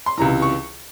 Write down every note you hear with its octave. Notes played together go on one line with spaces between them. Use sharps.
C6
C#2 C3 E3 A#5
C#6